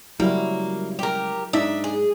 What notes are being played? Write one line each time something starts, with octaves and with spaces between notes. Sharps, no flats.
C#2 F#3 G3 A#3 E4 F#4
G4 A#4
G#2 D4 D#4 D5 E5
G#4